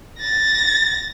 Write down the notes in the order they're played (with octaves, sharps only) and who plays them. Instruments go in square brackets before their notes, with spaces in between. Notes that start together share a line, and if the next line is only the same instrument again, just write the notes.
[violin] A6 A#6